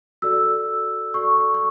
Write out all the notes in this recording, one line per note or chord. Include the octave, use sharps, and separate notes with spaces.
F#4 A4 D5 E6
F#4 A4 D5 C#6
C#6
C#6